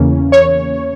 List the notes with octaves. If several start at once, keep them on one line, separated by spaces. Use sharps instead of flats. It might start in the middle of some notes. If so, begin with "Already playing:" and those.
Already playing: E2 C#3 E3 A#3 C#4
C#5